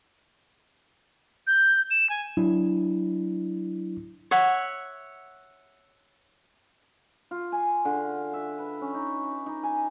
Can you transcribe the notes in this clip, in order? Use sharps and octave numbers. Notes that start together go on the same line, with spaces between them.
G6
E7
G#5
F#3 D4 E4
C#5 E5 F#5
F4
G#5
D3
E5
B4
C#4
D#4
D6
D#4
G#5